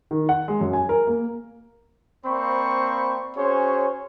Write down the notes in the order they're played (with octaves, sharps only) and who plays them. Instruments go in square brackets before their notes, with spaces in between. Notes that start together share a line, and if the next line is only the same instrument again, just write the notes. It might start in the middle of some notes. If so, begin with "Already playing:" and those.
[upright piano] D#3
F#5
G#3
F#2
G#5
A#4
A#3
[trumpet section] A#3 C4 C5 D5 B5 C#6
C#4 F#4 G#4 C5 C#5